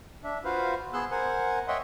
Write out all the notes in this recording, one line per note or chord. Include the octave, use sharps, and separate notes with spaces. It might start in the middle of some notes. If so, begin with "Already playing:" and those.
D4 E5
F4 F#4 B4 C5 F5
B3 G#4 C6 E6 F#6
A#4 C5 F#5 G#5
C#5 D#5 E5 F#5 G5 C6